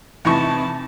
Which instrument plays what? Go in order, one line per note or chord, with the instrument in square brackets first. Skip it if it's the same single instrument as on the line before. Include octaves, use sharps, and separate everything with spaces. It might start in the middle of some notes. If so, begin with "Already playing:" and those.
[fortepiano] E2 A2 C#6 [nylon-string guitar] C3 E3 D#4 [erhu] A5